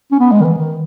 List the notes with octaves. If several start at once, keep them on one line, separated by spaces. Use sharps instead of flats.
C#4
B3
G#3
D#3
E3
D#3